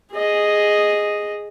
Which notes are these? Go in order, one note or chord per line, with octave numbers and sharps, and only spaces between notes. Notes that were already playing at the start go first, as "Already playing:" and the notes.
G#4 D#5